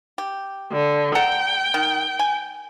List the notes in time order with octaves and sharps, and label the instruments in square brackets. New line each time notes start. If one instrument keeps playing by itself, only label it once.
[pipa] G4
[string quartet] D3
[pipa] F#5 A5 A#5 [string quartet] G5
[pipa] D#3
G#5